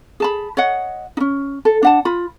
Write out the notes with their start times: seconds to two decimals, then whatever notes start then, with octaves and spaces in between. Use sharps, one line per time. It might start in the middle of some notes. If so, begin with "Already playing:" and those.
0.20 G#4 A5 B5
0.57 C#5 D#5 F#5
1.17 C#4 D#4
1.65 A4
1.83 D4 F#5 A5
2.05 F4 B5